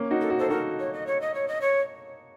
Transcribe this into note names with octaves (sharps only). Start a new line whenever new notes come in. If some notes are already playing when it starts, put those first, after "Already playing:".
Already playing: A#3 C#4
D#4 F#4
A4
F#4
A4 C5
D#4 F#4 A#4
C#5
D#5
C#5
D#5
C#5
D#5
C#5